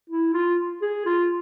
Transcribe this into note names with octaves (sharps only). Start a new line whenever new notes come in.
E4
F4
G#4
F4